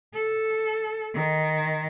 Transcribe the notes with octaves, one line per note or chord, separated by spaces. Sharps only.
A4
D#3